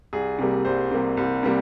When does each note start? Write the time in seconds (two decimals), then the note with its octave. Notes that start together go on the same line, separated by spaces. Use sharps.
0.13 C2 G#4
0.39 C3 G3 A#3
0.65 C2 C5
0.91 C3 G3 A#3
1.17 C2
1.43 C3 G3 A#3